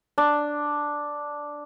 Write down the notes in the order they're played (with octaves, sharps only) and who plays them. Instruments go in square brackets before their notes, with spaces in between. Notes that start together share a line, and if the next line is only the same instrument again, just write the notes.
[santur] D4